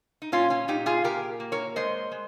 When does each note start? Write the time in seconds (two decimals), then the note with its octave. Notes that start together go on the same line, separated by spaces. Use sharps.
0.22 D#4
0.32 A#2 C#4 F4
0.50 C#4 F4
0.68 A#2 D#4 G4
0.86 F4 G#4
1.04 A#2 G4 A#4
1.40 A#3
1.52 A#4 C#5
1.76 G#3 C5 D#5
2.12 G#3